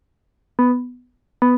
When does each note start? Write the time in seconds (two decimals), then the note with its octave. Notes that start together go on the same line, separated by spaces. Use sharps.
0.59 B3
1.42 B3